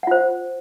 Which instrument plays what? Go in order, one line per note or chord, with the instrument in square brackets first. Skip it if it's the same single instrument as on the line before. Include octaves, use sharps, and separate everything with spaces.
[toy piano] F#5
F4
C5